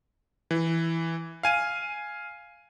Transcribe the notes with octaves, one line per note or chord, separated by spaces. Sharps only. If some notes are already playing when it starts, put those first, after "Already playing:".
E3
F5 G#5 D#7